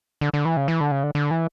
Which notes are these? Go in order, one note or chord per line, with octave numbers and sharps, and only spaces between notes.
D3
D3
E3
C#3
E3
D3
C#3
D3
D3
E3